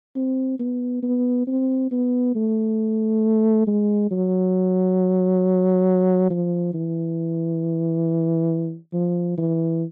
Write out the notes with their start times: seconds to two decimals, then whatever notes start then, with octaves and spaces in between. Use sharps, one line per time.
0.16 C4
0.59 B3
1.03 B3
1.47 C4
1.91 B3
2.35 A3
3.67 G#3
4.11 F#3
6.30 F3
6.74 E3
8.93 F3
9.38 E3